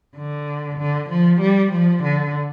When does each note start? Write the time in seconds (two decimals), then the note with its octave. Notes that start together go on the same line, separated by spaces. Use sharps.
0.16 D3
0.78 D3
1.10 F3
1.41 G3
1.72 F3
2.04 D3